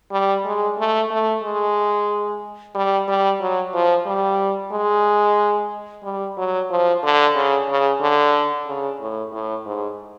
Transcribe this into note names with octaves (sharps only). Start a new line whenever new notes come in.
G3
G#3
A3
A3
G#3
G3
G3
F#3
F3
G3
G#3
G3
F#3
F3
D3
C#3
C#3
D3
C#3
A2
A2
G#2